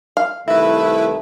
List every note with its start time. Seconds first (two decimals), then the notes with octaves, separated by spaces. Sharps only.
0.17 F5
0.48 C2 D#3 A3 E4 B4 E5